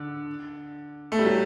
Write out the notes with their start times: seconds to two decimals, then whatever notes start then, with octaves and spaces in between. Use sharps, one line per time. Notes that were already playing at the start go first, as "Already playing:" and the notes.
Already playing: D3
1.12 A3
1.19 G3
1.26 F#3